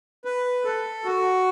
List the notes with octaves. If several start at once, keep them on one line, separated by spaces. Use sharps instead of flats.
B4
A4
F#4